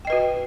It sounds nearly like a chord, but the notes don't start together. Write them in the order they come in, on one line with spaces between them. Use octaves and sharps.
G5 D#5 B4 F#4